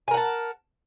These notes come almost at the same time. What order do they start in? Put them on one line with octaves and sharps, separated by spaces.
G#5 A#4 F#5 A5